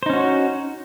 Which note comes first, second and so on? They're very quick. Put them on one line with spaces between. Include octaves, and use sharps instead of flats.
C5 D#4 C#4 F#4